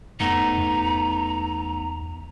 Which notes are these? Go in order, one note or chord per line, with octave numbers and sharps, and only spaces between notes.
F2 A3 B3 D#4 A#5
E2